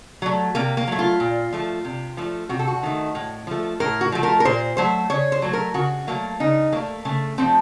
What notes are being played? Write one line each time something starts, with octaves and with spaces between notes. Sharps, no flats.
F#3 A3
C3 A#3
A#3
F#3 A3
F4
A#2
F3 A3
C3
F3 A3
C3 F#4
A4
F#4
D#3 A3
A2
F3 A3
A2 A#4
F#4
F3 A3
A#4
A#4
A#2 C5
F#3 A3 C5
C#3 C#5
C5
F#3 A3
A#4
C#3 F#4
F#3 A3 A#3
C#3 D#4
F#3 A3 A#3
C#3 A3
F3 A3 C4